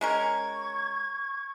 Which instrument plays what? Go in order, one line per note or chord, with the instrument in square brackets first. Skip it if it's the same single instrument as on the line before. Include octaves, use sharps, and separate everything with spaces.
[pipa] G#3 C#4 A#4 [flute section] C#6 G#6